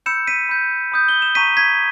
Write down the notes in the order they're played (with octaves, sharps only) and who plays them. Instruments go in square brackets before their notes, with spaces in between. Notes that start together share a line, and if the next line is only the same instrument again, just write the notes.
[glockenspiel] B5 E6 G6 C#7 E7
B6 D#7
B5 G6
B5 D#6 G6
G7
E7
A#5 C#6 G6 B6 D#7
G#6 B6